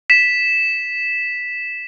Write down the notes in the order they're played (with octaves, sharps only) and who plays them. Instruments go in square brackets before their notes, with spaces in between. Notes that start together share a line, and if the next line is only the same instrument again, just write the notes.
[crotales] B6 E7